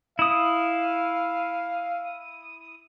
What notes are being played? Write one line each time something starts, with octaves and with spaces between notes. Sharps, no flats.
E4 F5 D#6